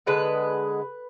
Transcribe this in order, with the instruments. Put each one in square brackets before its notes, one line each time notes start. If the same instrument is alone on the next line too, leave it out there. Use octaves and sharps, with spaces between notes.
[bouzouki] D3 G#3 B3 B4